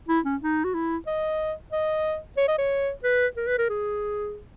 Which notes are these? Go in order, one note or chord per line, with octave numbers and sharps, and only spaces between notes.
E4
C#4
D#4
F#4
E4
D#5
D#5
C#5
D#5
C#5
B4
A#4
B4
A#4
G#4